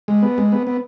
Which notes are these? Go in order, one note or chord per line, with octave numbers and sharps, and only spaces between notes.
G#3
B3
G#3
B3
B3